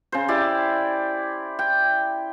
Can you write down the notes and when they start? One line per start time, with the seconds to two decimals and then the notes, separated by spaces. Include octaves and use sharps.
0.12 C#3 C5
0.28 E4 G4 D5
1.59 G5